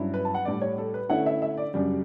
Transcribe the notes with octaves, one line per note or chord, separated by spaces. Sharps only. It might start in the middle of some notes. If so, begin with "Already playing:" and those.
Already playing: G2 F#3 C#4 E4
B4
A5
F#5
A2 G3 D4 D5
C#5
A4
B4
D3 A3 C#4 E4 F#5
E5
E5
D5
F#2 C#3 G3 D4